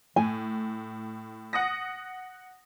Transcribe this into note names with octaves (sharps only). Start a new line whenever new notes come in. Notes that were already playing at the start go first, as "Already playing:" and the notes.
A2 G#5
F#5 D#6 A#6